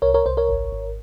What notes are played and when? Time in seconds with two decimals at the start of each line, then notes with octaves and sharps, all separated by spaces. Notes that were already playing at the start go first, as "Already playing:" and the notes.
0.02 C2 A#4 C#5
0.14 A#4 C#5
0.26 C2 C5
0.37 A#4 C#5
0.49 G#1
0.72 G#1